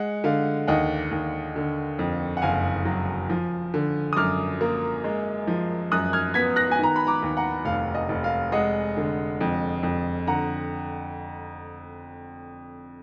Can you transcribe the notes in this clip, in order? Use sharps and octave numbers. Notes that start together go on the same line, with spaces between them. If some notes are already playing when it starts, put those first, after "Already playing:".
Already playing: G#3 F#5
D3 F5
D#2 D#5 F#5
D#2
D3
F2
F#5
F#1 F5 G#5
F#3
F3
D3
D#6
F#2 D6 F6
A#3
G#3
F3
F#2 D#6 F#6
F6 G#6
B3 G#6 B6
F#6 A#6
G#5
D#3 A#5
B5
A#5 D6
D#2
F#5 A#5
F1 F5
D#5
F1
F5
G#3 D#5 F#5
D3
F2
F2
D3 F#5 A#5